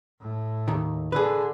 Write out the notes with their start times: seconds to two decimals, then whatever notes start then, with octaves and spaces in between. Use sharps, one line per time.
0.21 A2
0.68 D#2 D#3
1.12 D3 G#4 B4